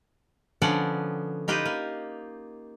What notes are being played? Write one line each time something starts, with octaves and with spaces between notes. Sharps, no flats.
D3 F3 B3 C#4 D5 F#5
D#4 F4 G4 B4 D#5
A#3